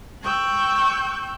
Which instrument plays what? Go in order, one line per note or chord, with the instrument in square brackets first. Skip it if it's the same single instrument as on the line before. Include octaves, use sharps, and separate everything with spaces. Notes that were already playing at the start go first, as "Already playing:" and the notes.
[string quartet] G5 C#6 E6 F#6 G6